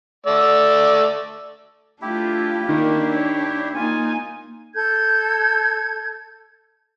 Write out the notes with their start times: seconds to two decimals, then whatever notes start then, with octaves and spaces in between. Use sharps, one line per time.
0.26 A3 D5 E6
2.02 A3 D4 E4 F4 G4
2.69 D#3 A#3 D4
3.15 C#5
3.76 A#3 D#4 F4 G#5
4.75 A4 G6 G#6